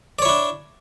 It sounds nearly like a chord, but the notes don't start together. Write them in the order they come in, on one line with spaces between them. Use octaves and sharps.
D5 C#5 E4 D4